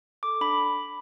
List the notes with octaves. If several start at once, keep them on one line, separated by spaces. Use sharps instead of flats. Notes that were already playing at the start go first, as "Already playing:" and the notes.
A4 D6
D4 B5